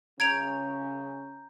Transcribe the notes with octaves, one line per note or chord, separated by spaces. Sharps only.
C#3 C#4 A#5 G6 G#6 D7 F7